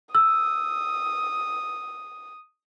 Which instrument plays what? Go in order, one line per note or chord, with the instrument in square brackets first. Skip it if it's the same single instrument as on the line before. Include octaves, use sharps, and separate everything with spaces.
[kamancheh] D#6 [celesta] E6